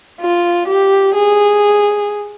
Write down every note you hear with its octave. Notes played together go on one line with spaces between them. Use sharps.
F4
G4
G#4